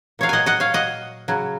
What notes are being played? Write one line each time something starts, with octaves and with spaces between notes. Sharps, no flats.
A#2 F#3 C#5 F5
D#5 F#5 G#5
D#5 F#5
C#5 F5
D#5 F#5
C#3 F#3